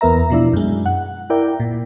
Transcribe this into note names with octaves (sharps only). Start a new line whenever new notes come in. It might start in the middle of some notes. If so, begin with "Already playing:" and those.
E2 B3 A#4 E5 A#5
B2 F3 D4 E4
F#2 G#3
F#5
E4 A#4 D5 G5
A#2